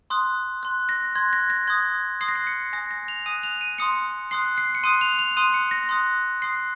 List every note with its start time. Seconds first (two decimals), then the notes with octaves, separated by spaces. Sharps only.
0.10 C6 D#6 F#6
0.63 C6 F#6
0.89 A#6
1.15 C6 G#6
1.18 F#6
1.33 A#6
1.50 A#6
1.68 C6 D#6 F#6 G#6
2.21 C6 D#6 F#6 C7
2.28 A#6
2.35 C7
2.47 C#7
2.73 G#5 D#6 F#6 A#6
2.91 A#6
3.08 F7
3.26 G#5 D#6 F#6 D#7
3.43 F7
3.61 D#7
3.78 C6 D#6 F#6 C#7
4.31 C6 D#6 F#6 C7
4.58 C7
4.75 C#7
4.83 C6 D#6 F#6 D#7
5.01 F7
5.19 F7
5.36 C6 D#6 F#6 D#7
5.54 C#7
5.71 A#6
5.89 C6 D#6 F#6
6.42 C6 D#6 F#6 C7